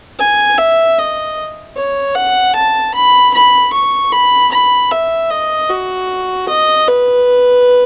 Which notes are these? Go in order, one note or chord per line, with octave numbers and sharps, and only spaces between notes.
G#5
E5
D#5
C#5
F#5
A5
B5
B5
C#6
B5
B5
E5
D#5
F#4
D#5
B4